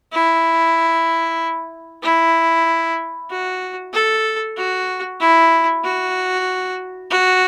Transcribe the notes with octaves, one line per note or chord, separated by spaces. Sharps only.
E4
E4
F#4
A4
F#4
E4
F#4
F#4